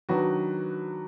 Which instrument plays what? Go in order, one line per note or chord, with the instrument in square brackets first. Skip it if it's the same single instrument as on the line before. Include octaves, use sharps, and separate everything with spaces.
[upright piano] D#3 F#3 D4 F#4 B4